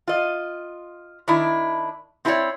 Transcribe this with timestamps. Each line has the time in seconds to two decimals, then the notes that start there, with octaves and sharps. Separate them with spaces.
0.08 F4 D#5
1.28 D#3 D4 E4
2.25 C4 E4 G#4 A4 C#5 D5